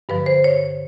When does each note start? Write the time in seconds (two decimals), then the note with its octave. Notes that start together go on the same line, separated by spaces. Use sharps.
0.09 G2 D3 F3 B4
0.26 C5
0.44 C#5